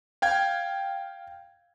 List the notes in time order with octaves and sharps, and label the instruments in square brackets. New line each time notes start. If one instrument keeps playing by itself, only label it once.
[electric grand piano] F5 G5 G#6